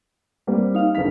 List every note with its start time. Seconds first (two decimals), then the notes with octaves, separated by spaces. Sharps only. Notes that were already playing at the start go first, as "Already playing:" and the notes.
0.47 G3 A#3 C4
0.74 D#4 F5
0.95 F#1 D3 F5 B6